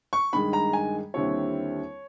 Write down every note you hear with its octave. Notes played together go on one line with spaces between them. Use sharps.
C#6
G2 D#3 G#3 B5
A#5
G#5
D#2 D3 G3 C4 E4 C#5